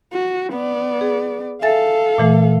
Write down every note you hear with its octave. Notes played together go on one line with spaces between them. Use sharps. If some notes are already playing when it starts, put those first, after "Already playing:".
F#4
B3 D5
G#4
A4 E5 F5 G#5 A6
A#2 E3 A3